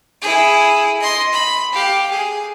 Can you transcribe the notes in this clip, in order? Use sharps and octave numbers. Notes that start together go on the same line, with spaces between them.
E4 G#4
D#5 C6
B5
G4 F5
G#4